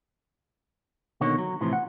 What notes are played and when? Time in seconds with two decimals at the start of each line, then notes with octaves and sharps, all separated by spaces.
1.21 B2 D3 D#3 A#3 C#5
1.38 F#3
1.61 A2 C3 E3 F3
1.73 F#5